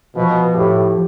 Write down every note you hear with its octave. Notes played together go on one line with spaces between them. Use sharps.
B2 F3
A2 G4
F3